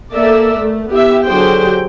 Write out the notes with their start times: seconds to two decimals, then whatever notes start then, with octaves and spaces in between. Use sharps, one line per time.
0.14 A#3 A4 A#4 D5 E5
0.59 A3
0.91 B3 E4 G4 E5
1.26 D3 F#3 G4 G#4 C5 G5